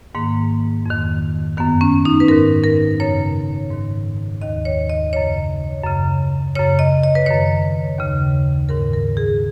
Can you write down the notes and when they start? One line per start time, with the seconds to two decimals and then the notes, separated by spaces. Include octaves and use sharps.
0.15 G#2 D#3 A#3
0.86 F2 D#3
1.57 F#2 D#3 B3
1.81 C#4
2.05 D#4
2.20 B4
2.28 G#2 D#3 A#4
2.64 A#4
3.00 F#2 C#3 C#5
3.71 G#2 D#3
4.42 D#2 D#3 D#5
4.65 C#5
4.89 D#5
5.13 F#2 C#3 C#5
5.84 F#2 C#3
6.55 F#2 C#3 C#5
6.79 D#5
7.03 D#5
7.15 B4
7.26 F#2 D#3 C#5
7.98 D#2 C#3
8.69 G#2 D#3 A#4
8.93 A#4
9.17 G#4